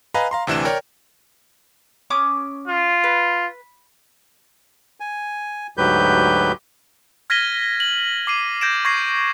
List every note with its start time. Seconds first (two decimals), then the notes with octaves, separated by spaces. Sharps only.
0.14 B4 D#5 F5 G#5 A#5 B5
0.31 F5 A#5 C6
0.47 D2 C3 E3 D4 E7
0.65 A#4 C#5 D5 G5
2.10 C#4 D6 D#6
2.68 F4
3.04 B4
5.00 G#5
5.77 D2 G#2 F#3 G4 B4 G6
7.30 F6 G#6 A#6 B6 D#7 G7
7.80 F#7
8.27 D6 C7 D#7
8.61 G6 G#6 A#6 D7 E7
8.85 C#6 G#6 A#6 C7